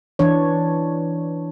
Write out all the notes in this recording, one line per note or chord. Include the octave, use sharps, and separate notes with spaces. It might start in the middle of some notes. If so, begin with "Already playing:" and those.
E3 D4 C#5